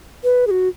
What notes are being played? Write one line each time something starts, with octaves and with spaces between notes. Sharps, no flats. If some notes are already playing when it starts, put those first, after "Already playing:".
B4
G#4
F#4